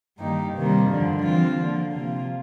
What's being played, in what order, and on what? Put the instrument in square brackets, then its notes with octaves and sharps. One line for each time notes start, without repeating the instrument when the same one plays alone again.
[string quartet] G2 D#3 A#3 D#4 G4
C3 D#3 G3 A#3
G2 D3 F3
F3 C4 F4
D3 F3 A#3
C3 F3 A#3 F4